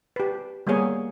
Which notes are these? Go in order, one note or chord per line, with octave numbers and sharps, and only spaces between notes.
G4 B4
G3 A#3 B3 G#4 C#5 G#5